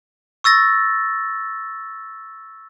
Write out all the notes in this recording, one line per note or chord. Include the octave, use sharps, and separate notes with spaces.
C#6 E6 A6 A#6